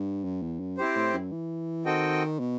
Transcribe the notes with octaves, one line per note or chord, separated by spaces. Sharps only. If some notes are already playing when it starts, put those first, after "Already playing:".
Already playing: G2
F#2
E2
F#2
C4 E4 G4 C5
A2
F#2
E3
D#3 C4 F#4 A4 D#5 G5
B2